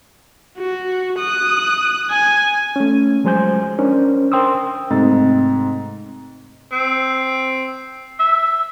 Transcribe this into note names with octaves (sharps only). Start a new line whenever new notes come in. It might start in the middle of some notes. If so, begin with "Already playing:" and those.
F#4
D#6 F#6
G#5
A3 C#4
F3 F#3 G#3 C5 G#5 G6
C#4 D4 A#4 C5
A#4 C5 G5 C6 D#6 E6
G#2 C3 A3 C4 A6
C4
E5